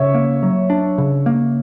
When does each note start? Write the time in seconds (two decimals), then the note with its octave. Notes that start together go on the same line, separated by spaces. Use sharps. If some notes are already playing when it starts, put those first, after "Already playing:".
Already playing: C#3 C#5 E5
0.14 A#3
0.43 F#3
0.70 D4
0.98 C#3
1.26 A#3